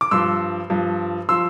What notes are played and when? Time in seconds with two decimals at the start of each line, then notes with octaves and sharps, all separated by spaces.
0.01 D6
0.11 G2 F3 C6 E6
0.70 G2 F3
1.29 F3 C6 E6